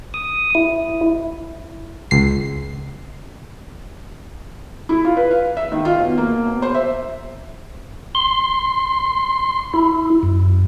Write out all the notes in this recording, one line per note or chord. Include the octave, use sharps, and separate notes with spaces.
D#6
E4
C#2 C7
E4
F4
B4
F5
E5
D#3
F4
B2
A#3
B2
C5
E5
C6
E4
F#2